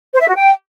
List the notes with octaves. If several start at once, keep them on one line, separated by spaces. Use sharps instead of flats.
C5
E5
F#4
G5